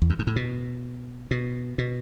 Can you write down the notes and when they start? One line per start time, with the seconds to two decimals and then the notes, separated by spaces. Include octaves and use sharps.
0.02 E2
0.10 F#2
0.19 G#2
0.27 A2
0.36 B2
1.31 B2
1.78 B2